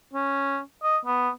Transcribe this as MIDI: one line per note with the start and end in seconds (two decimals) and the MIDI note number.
0.13 0.60 61
0.83 0.98 75
1.05 1.30 59